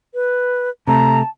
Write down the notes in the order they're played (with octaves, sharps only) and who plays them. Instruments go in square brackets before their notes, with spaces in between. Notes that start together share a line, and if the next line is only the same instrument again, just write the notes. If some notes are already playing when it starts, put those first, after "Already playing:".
[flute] B4
[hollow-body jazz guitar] C3 A3 [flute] A5 [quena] A#5